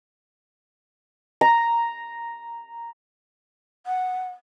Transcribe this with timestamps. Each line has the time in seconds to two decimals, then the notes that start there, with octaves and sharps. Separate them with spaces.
1.41 A#5
3.87 F#5